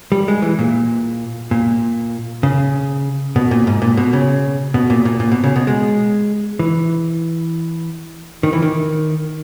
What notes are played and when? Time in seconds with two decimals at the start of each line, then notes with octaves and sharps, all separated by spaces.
0.12 G3
0.28 G#3
0.42 E3
0.59 A#2
1.51 A#2
2.43 C#3
3.36 B2
3.51 A#2
3.67 G#2
3.82 A#2
3.97 B2
4.13 C#3
4.74 B2
4.90 A#2
5.05 A#2
5.20 A#2
5.32 B2
5.44 C#3
5.56 B2
5.67 G#3
6.59 E3
8.43 D#3
8.53 E3
8.62 D#3